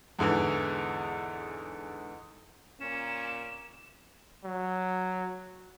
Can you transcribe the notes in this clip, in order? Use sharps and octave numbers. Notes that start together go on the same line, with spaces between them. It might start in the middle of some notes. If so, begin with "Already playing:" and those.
E2 G#2 D3 E3
A#2 C#4 E7
F#3